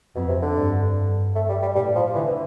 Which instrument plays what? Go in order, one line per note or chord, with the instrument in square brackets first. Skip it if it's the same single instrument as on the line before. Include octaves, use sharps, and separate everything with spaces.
[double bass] F2 [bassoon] B2
[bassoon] C3
D3
[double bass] G2
G2
[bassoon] A3
G3
G3
[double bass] A2 [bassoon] G3
[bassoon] F3
[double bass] D3 [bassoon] E3